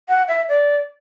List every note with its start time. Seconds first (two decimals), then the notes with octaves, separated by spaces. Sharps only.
0.09 F#5
0.28 E5
0.49 D5